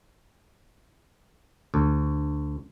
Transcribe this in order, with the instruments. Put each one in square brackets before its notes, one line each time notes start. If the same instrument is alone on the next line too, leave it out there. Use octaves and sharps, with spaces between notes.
[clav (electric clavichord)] D2